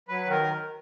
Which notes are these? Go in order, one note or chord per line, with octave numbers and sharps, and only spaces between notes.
F#3 B4
D#3
A#4